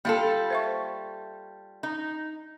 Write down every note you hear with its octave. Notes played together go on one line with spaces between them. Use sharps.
G3 A#3 F4 A4 F5
C5 E5 C#6
D#4